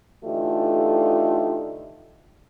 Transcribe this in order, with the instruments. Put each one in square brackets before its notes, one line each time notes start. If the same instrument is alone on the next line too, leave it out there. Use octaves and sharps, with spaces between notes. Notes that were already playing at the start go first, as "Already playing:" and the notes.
[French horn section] D3 E3 A3 D#4 F4 G4